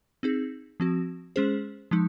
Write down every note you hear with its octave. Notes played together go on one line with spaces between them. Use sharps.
C4 D#4 G#4
F3 C4 F#4
G#3 C#4 G#4 C5
F3 G#3 D#4